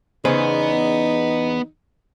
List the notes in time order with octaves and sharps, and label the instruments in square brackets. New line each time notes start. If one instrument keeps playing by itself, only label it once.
[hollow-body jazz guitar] E2 C#3 C5 [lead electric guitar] B3 B4 [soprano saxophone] D#4